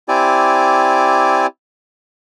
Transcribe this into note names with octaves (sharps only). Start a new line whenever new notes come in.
C4 E4 G4 D5 G#5